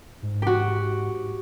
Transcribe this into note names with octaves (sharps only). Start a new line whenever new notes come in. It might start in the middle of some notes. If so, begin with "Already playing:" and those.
G#2
F#4 G4